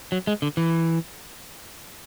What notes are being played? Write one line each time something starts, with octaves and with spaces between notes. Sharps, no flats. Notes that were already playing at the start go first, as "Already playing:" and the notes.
F#3
G#3
D3
E3